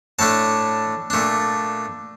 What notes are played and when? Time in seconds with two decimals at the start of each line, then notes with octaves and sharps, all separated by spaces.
0.19 A2 A3 D4 A5
1.10 A#2 A3 D4